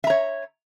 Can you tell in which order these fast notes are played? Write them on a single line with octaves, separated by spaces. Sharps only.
E5 A#5 C#5